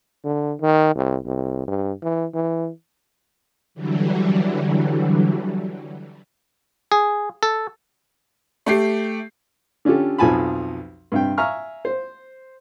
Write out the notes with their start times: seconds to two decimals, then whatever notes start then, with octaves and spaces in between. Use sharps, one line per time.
0.24 D3
0.61 D#3
0.95 C2
1.25 C2
1.68 G2
2.02 E3
2.34 E3
3.75 D3 E3 F#3 G3
6.92 G#4
7.43 A4
8.66 A3 G4 C7
9.85 D3 C#4 F4 G4 A4
10.18 B1 F2 F3 G#5 A5 B5
11.12 G2 C3 G5
11.38 E5 F5 G#5 A#5 C#6 F6
11.85 C5